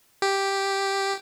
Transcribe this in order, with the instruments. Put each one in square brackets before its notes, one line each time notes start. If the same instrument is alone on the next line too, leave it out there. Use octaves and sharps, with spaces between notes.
[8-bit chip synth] G4